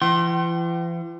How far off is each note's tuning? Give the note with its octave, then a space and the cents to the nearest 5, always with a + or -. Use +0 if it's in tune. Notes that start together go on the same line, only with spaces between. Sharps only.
E3 +45 G5 -40 C6 +20